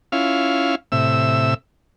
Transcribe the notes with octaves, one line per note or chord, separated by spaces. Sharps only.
C#4 E4 F4 F5
A2 C3 E5 E6